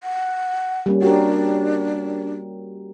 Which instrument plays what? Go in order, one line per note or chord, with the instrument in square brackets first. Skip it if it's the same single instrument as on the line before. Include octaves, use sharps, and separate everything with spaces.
[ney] F#5
[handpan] G3 A#3 C#4
[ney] D4 [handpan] F#4 G4 A#4